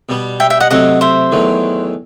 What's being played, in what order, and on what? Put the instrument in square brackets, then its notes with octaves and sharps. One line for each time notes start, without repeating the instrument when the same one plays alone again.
[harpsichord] B2 G3 B3
[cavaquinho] E5 G5
E5 G5
D#5 F#5
[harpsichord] C3 F#3 A3 C4 [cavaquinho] D#5 F#5
[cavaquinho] C5 E5
[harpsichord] E2 D#3 F#3 A3